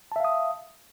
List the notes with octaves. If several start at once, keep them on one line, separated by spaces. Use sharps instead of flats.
E5 F5 A5 D#6